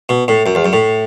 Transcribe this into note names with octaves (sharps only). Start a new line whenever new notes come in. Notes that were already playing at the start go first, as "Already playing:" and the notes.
B2
A2
F#2
E2
F#2
A2